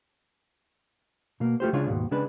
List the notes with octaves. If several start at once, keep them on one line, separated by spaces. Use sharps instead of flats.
B2 A#3
A3 F4 G4 C5
C#3 G#3 D4 F4 C#5
D#2 G#2 B2
C#3 G#3 D4 B4